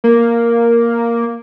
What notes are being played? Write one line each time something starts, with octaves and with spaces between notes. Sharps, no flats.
A#3